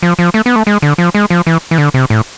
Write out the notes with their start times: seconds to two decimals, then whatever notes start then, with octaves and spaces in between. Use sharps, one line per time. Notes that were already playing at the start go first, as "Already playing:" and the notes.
0.03 F3
0.19 F3
0.34 A3
0.46 B3
0.56 A3
0.67 G#3
0.82 D3
0.98 F3
1.15 G#3
1.30 F3
1.47 E3
1.71 E3
1.78 D3
1.94 C3
2.10 A2